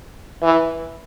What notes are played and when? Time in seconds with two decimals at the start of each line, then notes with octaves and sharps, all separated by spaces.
0.43 E3